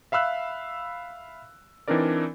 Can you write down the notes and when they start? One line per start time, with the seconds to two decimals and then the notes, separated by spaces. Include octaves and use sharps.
0.12 E5 F5 B5 E6 F#6
1.88 E3 C4 D4 D#4 A#4 D5